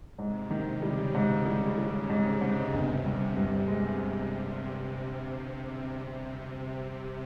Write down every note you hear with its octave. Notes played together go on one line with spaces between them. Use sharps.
G#2 C3
D#3
C#3 G3
G#2
G3
G3
G#2 C3
G#2
G1
G2
G2 C3
G#3